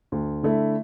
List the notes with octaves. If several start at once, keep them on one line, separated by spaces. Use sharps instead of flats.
D2
D3 A3 E4